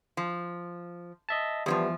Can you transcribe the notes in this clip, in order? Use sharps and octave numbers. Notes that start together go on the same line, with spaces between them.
F3
D#5 E5 A5
E2 E3 F3 G3 B3